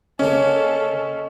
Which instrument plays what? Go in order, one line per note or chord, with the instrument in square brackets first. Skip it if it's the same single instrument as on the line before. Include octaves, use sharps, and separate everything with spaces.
[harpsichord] C#3 A#3 [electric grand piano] C#4 [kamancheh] A4 [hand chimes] C#5 D#5